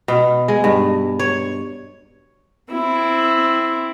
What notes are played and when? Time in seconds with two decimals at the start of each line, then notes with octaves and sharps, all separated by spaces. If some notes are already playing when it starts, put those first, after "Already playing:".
0.08 B2
0.48 G#3
0.64 G2
1.19 C#5
2.72 C4 E4